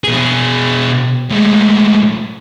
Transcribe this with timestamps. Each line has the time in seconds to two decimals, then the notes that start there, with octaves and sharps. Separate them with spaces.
0.04 B2 G#4
1.30 A2 G#3